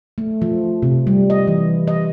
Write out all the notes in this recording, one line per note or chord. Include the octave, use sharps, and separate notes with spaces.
A3
F3
C3
G3
D#5
E3
D#5